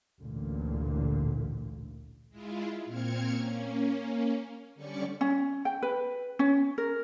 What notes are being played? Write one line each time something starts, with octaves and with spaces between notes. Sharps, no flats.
A1 D2 A#2 D3
G#3 E4 F4
A#2 C4 F6 G#6 C#7
A#3 C#4
D3 G3 C#4 D5 C#6
C#4
G5
B4
C#4
A#4